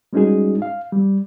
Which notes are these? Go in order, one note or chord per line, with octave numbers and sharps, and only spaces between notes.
G3 G#3 C#4 D#4 F#4 G#4
F5
G3